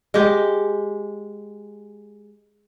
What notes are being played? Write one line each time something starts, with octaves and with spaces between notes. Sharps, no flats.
G#3 G4